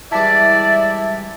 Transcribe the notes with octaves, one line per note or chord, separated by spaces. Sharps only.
E3 G3 G#3 E4 D5 A5 B6